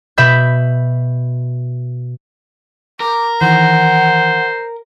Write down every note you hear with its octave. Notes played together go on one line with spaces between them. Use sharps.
B2 E5 B5 G6
A#4 D6
D#3 E3 C5 F#5